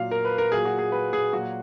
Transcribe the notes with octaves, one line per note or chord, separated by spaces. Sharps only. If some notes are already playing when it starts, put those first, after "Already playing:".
Already playing: A#2 F#3 F5
A#4
B4
A#4
A#2 F#3 G#4
F#4
G#4
B4
G#4
A#2 F#3 F#4